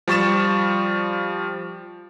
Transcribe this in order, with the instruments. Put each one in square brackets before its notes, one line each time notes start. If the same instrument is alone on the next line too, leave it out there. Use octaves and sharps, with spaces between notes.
[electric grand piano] F3 G3 C#6 A6 E7